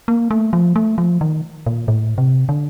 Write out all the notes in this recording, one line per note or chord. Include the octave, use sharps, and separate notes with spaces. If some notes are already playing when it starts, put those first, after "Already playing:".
A#3
A3
F3
A3
F3
D#3
A#2
A2
C3
D3